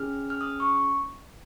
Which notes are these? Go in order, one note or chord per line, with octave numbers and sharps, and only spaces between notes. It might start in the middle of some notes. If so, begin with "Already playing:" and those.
Already playing: C#4 G#4 F6
F6
D#6
C#6